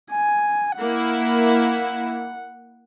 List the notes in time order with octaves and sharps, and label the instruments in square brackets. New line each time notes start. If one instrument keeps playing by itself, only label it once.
[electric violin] G#5
[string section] A#3 E4 [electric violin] F#5